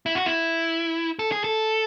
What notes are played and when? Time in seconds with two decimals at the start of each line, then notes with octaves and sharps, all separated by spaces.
0.06 E4
0.15 F#4
0.26 E4
1.19 A4
1.32 G#4
1.44 A4